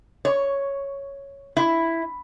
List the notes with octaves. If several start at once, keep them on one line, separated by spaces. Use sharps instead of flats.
C#5
E4